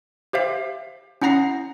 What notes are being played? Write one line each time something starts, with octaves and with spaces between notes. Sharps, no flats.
G4 C5 E5 F5
C#4 E4 F#5 A#5 A#6 C7